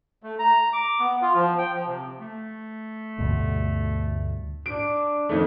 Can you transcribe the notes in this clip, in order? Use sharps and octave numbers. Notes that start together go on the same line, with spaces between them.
A3
A#5
D6
B3
F4
F3
G5
F3
C3
A3
D2 G2 B2
D4 D7
F2 D#3 A3